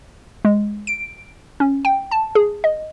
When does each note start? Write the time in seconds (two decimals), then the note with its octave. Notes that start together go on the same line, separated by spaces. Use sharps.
0.45 G#3
0.87 D7
1.60 C#4
1.85 G5
2.11 A5
2.35 G#4
2.64 D#5